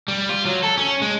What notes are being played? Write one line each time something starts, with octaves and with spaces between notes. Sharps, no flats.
G3
F4
F#3
A4
C#4
G#3